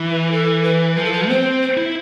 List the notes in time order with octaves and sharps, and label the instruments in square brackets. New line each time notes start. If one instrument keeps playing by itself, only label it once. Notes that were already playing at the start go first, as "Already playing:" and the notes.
Already playing: [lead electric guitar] E3
[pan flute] B4
A4
B4
[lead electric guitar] F3 [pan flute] B4
[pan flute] A4
B4
[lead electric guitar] C4 [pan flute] C5
[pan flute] C5
[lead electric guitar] E4